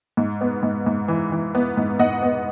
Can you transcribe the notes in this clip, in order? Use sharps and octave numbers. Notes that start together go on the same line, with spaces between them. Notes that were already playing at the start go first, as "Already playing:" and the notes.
G#2
B3
G#2
G#2
E3
E3
B3
G#2
G#2 D#5 F#5
B3